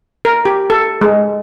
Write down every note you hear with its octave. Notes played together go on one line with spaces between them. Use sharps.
A#4
G4
A4
G#3